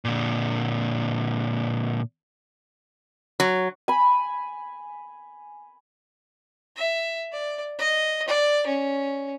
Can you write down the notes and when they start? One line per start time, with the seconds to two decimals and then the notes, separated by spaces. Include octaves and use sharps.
0.05 A#2 D3
3.40 F#3
3.88 G#5 B5
6.77 E5
7.33 D5
7.78 D#5
8.28 D5
8.67 C#4